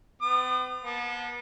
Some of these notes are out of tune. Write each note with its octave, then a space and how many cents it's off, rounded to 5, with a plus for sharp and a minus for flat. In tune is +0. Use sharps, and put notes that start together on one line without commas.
B3 +45 D#6 -35
B3 -40 A5 -5